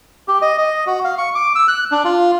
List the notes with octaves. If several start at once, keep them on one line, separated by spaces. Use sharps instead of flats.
G4
D#5
D#5
F#4
F5
C#6
D6
E6
F#6
D4
F4